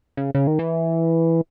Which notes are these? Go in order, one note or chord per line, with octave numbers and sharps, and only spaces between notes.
C#3
C#3
D#3
E3